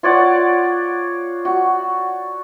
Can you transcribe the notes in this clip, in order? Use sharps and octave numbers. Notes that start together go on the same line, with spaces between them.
F4 C#5 D5 F#5
F#4